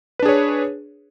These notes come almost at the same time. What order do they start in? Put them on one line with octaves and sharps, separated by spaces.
B4 D4 G#4 C#5